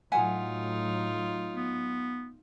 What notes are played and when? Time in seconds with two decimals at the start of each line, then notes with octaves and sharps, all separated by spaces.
0.12 A2 F#3 D#4 F4 E5 F#5 G#5
1.53 B3